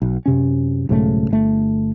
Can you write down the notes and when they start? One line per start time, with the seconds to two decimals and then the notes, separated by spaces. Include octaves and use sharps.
0.02 B1
0.26 F#2 C3 C#4
0.89 B1 G#2 C#3 A3
1.31 G1 A3